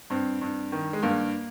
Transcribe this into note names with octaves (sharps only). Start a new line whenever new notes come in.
G2 C4
G2
D#3
G#3
G2 A#3